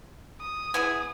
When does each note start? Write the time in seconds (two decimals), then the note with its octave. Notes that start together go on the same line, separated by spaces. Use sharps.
0.41 D#6
0.74 B3 E4 G#4 G#5